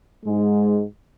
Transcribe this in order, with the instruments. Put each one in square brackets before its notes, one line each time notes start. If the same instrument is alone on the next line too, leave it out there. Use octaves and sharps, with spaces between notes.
[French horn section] G#2 G#3